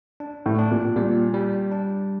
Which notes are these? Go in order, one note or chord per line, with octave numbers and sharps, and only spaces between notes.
D4
A2
D4
A#2
A#2 G3
G3
D4